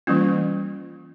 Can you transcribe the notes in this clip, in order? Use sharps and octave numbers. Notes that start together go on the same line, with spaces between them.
E3 G3 A#3 C#4 F4